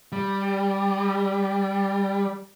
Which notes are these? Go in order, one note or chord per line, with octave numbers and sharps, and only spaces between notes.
G3